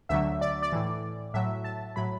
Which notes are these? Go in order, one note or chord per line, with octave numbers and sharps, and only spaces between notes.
D2 D3 F#3 E5
D5
D5
A2 E3
A2 F#3 E5
A5
A2 F#3 B5